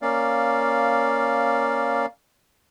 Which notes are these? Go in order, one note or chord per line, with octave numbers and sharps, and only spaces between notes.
A#3 C#4 D5 F5